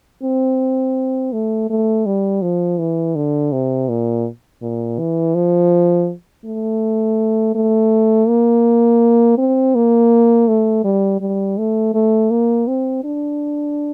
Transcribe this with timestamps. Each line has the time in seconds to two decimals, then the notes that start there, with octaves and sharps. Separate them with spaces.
0.23 C4
1.32 A3
1.70 A3
2.06 G3
2.42 F3
2.79 E3
3.16 D3
3.52 C3
3.89 A#2
4.62 A#2
4.99 E3
5.35 F3
6.45 A3
7.55 A3
8.28 A#3
9.38 C4
9.75 A#3
10.48 A3
10.84 G3
11.21 G3
11.58 A3
11.94 A3
12.31 A#3
12.68 C4
13.04 D4